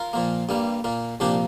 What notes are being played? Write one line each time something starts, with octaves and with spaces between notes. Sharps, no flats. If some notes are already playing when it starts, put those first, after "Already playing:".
Already playing: F4 A#4
A#2 F3 A#3
G2 G3 A#3
A#2 A#3
C2 A#2 F3 A#3 D4 G4